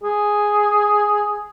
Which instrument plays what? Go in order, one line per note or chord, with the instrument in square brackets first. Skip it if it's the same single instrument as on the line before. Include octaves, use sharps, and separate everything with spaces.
[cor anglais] G#4